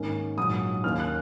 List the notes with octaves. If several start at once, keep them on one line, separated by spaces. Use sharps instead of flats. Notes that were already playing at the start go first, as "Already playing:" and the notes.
Already playing: G#2 D#3 A#3 C#4
A#1 G#2 F#3 D#6
D#2 D#3 A#3 C#4 F6
F#6